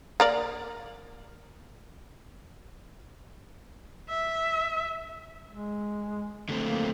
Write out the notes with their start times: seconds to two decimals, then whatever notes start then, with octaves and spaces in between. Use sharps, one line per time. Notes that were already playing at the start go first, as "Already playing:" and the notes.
0.20 A#3 A#4 D5
4.09 E5
5.51 G#3
6.49 D3 A3 C4
6.64 A#3